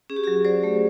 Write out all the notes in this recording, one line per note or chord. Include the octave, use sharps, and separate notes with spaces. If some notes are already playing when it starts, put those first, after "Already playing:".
C#4 G#4
G4
F#3 F#4 G#4
F#3 C5 D5
A3